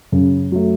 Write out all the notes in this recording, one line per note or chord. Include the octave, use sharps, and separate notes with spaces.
F#2 C#3
F#3 A3